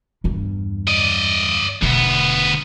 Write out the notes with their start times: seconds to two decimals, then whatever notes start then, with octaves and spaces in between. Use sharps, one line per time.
0.24 E2 G2
0.88 D5 D#5
1.82 E1 D2 B3